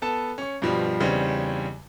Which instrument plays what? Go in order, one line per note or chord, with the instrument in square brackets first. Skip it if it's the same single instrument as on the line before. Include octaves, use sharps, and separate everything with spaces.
[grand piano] B3 A4 A5
C#4 C#6
G2 B2 F3 G3
E2 C#3 G3 C4 D#4